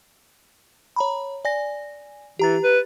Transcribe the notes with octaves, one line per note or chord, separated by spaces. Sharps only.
C#5 A#5 B5
D5 G#5 A#6
E3 G4 A#5 A6
B4